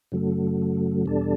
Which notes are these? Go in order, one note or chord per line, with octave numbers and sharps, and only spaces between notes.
F#2 C#3 F#3 A3
E2 B2 G3 D4 A4